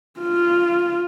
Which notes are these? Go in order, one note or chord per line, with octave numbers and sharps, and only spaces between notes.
F4